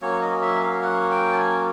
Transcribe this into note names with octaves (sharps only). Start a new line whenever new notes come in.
F#3 A#3 C#4 C#5
D#5
E5
F5
F#5
G5
A5
G#5